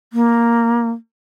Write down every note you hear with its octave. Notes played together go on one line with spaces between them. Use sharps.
A#3